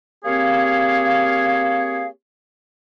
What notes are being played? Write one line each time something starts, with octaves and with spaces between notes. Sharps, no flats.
A#3 C4 G4 G#4 C#5 F5